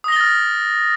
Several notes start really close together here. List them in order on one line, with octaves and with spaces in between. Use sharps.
D#6 A#6 G7 A6 F6